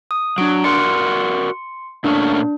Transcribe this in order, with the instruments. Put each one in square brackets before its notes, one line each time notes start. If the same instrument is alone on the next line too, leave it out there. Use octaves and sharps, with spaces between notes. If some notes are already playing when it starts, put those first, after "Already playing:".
[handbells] D#6
[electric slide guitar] F#3 [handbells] D4 D7
[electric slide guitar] F#4 A#4 D5 [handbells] C6 C#7
[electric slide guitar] A#2 A3 C#4 [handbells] D4